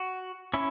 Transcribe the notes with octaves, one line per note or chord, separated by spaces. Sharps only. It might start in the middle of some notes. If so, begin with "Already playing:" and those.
Already playing: F#4
C#4 E4